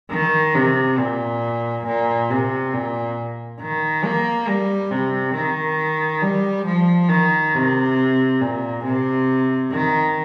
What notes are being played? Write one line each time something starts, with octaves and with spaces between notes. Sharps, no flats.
D#3
C3
A#2
A#2
C3
A#2
D#3
A#3
G3
C3
D#3
G3
F3
D#3
C3
A#2
C3
D#3